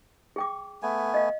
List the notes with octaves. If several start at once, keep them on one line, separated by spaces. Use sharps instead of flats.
G#4 G5 D6
A3 B3 G#5
D#5 F5